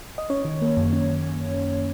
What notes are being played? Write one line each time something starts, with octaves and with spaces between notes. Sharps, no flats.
D#5
C#4 C#5
D#3
A#3
F#2
C#4